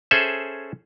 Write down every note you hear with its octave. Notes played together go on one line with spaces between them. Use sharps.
C#4 G#4 A4 C5 E5